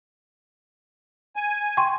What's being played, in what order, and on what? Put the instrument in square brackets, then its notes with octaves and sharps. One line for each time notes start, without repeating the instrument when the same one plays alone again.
[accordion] G#5
[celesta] G5 C6 C#6